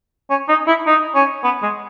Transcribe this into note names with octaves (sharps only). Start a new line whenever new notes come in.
C#4
D#4
E4
D#4
C#4
B3
G#3